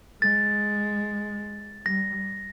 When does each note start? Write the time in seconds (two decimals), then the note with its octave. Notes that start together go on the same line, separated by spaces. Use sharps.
0.21 G#3 A6
1.86 G3 A#6